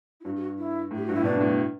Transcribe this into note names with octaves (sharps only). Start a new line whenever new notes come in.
E4
G2 F#4
G4
F#4
E4
A2
G4
G2 F#4
A2 E4
B2 D4
G2
A2
G2